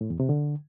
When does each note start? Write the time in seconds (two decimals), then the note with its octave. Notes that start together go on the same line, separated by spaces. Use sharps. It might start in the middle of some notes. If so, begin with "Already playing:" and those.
0.01 A2
0.10 E2
0.20 C3
0.29 D3